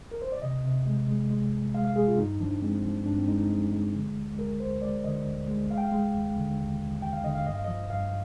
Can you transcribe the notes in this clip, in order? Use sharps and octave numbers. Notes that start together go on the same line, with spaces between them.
A#4
C5
D5
C3 D#5
C3
G#3
G#3
G#3
C2
G#3 F5
F5
G#3 G#4
F4
G2 D#4
F3 D4
G#3 C4
F3
G2 D4
C4
G#3 D#4
D#4
G#3
G#3
D3
D2
G#3 A#4
D2 C5
G#3 D5
D3 D#5
D2
G#3
G#3 F5
G5
F5
G#3
D#2
D3
D#2
D#2
D#2 G5
F5
D3 D#5
F5
G2 D#5
F5
F3 D#5
G2 F5